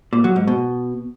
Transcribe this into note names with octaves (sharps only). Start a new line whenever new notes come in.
A#2
F#3
G#2
B2